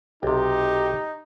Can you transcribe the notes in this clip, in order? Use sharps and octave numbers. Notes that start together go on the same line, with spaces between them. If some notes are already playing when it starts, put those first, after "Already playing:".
B1 C3 D#4 G4